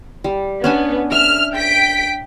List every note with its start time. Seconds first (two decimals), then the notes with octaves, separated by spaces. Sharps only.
0.24 G3
0.64 B3 C#4 D4 G#5
1.12 E5 F6
1.55 G5 B6 D7